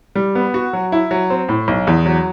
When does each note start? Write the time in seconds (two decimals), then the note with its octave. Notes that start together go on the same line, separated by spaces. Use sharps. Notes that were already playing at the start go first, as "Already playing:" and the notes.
0.15 G3
0.35 B3
0.54 F#4
0.73 F#3
0.92 E4
1.11 F#3
1.30 C4
1.49 A2
1.68 B1
1.87 E2
2.06 F#3